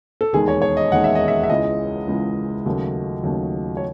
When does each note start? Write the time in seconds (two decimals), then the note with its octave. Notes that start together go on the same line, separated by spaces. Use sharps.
0.21 A4
0.33 E1 D#2 D#3 G#3 G#4
0.48 C#5
0.62 C#5
0.77 D#5
0.91 E1 D#2 D#3 G#3 F#5
1.04 E5
1.15 D#5
1.28 E5
1.44 E5
1.50 C#2 C#3 E3 G#3 D#5
2.08 C#2 C#3 E3 G#3
2.66 D#2 C#3 F#3 A3
3.24 D#2 C#3 F#3 A3
3.77 C#5